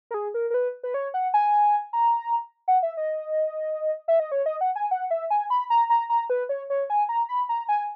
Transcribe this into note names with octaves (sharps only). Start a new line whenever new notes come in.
A#4
G#4
A#4
A#4
B4
B4
C#5
F#5
G#5
A#5
F#5
E5
D#5
E5
D#5
C#5
D#5
F#5
G#5
F#5
E5
G#5
B5
A#5
A#5
A#5
B4
C#5
C#5
G#5
A#5
B5
A#5
G#5